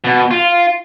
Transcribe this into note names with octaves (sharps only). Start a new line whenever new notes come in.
B2
F4